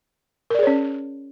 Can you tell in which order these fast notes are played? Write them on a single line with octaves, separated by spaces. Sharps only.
A#4 D5 G#4 C#5 C#4